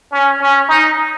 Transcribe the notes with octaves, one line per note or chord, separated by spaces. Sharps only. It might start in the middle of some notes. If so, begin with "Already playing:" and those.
C#4
C#4
D#4